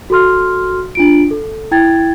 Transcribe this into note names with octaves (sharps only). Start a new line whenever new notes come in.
F#4 A4 C6 F6
D4 F4 D7
A4
E4 G5 G#6 A6